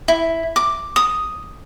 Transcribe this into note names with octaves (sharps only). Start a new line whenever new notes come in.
E4
D6
D#6